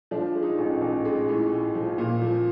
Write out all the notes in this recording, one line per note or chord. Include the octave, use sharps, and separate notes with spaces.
F3 D4
G#3
D#4
A1
A1
G#3
A2
A2
F3
A#2
F3